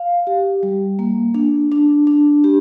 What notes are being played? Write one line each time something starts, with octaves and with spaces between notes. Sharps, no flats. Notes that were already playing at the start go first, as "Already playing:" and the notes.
Already playing: F5
G4
G3
A#3
D4
D4
D4
G4